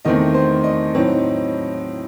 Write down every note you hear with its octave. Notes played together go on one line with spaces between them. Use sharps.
E2 D#3 A3 C4 D#5
C5
D#5
A2 F#3 C4 D#4